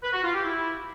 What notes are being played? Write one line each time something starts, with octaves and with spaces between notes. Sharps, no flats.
B4
F#4
F4
G4
E4